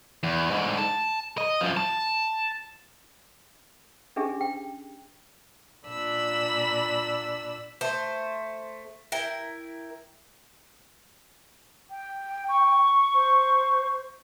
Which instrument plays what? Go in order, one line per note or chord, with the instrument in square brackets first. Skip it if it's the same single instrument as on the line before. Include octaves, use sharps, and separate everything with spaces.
[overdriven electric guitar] E2
G#2 D3
A5
D#5
F#2 F3
A5
[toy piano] C#4 D4 G4 G#4 E5
G5
[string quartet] A#2 D4 B5 E6
[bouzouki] A3 C5
E4 A#4 G5
[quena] G5
[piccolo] C#6
[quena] C5